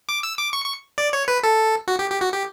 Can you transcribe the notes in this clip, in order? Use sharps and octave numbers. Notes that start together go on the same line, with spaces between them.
D6
E6
D6
C#6
C#6
D5
C#5
B4
A4
F#4
G4
G4
F#4
G4